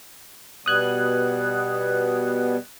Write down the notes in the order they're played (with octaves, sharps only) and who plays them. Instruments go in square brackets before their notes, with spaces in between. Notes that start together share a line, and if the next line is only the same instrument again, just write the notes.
[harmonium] B2 G3 B3 [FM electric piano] D#6 F#6 G#6